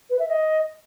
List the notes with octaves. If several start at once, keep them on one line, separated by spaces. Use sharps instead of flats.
B4
E5
D#5